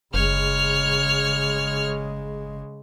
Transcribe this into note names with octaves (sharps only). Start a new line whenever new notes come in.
F#1 C#3 G#3 C#5 F6